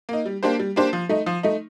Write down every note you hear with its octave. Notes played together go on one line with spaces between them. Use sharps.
A#3 D#4
G3
A#3 D4 G4 C5
G3
A#3 D4 G4 C5
F3
A3 D#4
F3
A3 D#4